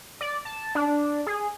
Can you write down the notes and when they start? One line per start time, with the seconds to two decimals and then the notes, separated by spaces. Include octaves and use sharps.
0.21 D5
0.45 A5
0.75 D4
1.27 G#4